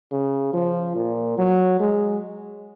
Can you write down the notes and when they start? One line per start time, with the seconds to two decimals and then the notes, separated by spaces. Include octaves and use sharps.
0.11 C#3
0.53 F3
0.96 A#2
1.38 F#3
1.80 G#3